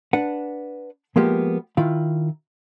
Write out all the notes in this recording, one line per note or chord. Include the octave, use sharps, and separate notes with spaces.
D4 B4 F#5
F3 G#3 A#3 B3 G4
D#3 E4 F4 F5